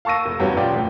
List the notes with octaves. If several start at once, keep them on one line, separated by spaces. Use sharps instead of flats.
F5 A5 C#6 E6 A#6 D#7
F1
E2 G2 E3 F#3 B3 C#4
E1 F4 G4 D5
F2 A2